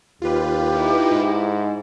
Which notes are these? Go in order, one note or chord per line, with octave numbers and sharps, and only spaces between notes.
D#2 F4 G4 B4
D#4 E4
G#2